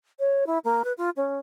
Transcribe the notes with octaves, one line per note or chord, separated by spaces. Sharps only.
C#5
E4
A#3
B4
F4
C#4